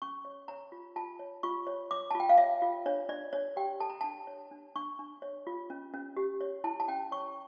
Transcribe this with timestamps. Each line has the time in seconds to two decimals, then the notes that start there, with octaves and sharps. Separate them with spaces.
0.02 C#4 C#6
0.25 C#5
0.48 C#5 A#5
0.72 F4
0.96 F4 A5
1.19 C#5
1.43 F4 C#6
1.67 C#5
1.91 C#5 D6
2.11 A5
2.15 F4
2.20 G5
2.29 F5
2.38 C#5 E5
2.62 F4
2.86 D4 C#5
3.09 D4 D5
3.33 D4 C#5
3.56 G4 G5
3.80 A4 A5
3.90 A#5
4.01 D4 A5
4.27 C#5
4.51 D4
4.76 D4 C#6
4.99 D4
5.22 C#5
5.47 F4
5.70 C#4
5.94 C#4
6.17 G4
6.41 C#5
6.64 E4 A5
6.80 A5
6.88 C#4 G5
7.12 C#5 C#6